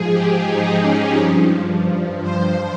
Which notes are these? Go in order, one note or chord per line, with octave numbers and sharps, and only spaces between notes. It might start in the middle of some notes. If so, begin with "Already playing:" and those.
Already playing: G#2 F3 G#4
G4
D#4
C#4
G2 F3
C5